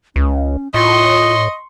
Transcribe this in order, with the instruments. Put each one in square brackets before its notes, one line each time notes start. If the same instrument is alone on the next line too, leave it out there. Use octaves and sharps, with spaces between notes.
[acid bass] C#2 [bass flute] C#4
[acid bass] A2 [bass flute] F4 [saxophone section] D#5 [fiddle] C6 C#6